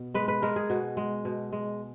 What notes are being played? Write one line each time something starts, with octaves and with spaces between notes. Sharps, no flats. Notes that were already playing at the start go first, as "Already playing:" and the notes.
Already playing: B2
G#3 B4
B4
G#3 A#4
G#4
B2 F#4
G#3
B2
G#3